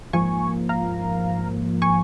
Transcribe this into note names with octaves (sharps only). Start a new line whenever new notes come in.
G#2 F3 A#3 G#5 C#6
F5 A#5
G#5 C#6